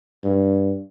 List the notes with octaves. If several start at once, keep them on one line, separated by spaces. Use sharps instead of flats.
G2